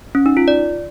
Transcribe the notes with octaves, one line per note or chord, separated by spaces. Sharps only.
C#4
D#4
F4
D5